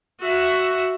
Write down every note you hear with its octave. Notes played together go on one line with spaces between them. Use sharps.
F#4 E5